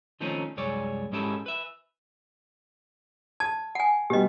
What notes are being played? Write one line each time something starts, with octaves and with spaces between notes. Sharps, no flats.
D#3 F3 A3 C4 C#4 D#4
C2 F#2 G#3 C#5 D5
G#2 G#3 C#4 E4 G4 A4
B4 E5
A5 G#6
F#5 G#5
B2 G3 G4 D#5